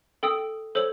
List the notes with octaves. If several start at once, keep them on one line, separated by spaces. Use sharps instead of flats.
A4 G5 D#6 E6
A4 C5 C#5 E6 F#7